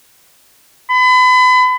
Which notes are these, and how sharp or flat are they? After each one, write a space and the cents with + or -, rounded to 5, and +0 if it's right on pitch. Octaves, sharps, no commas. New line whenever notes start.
B5 +35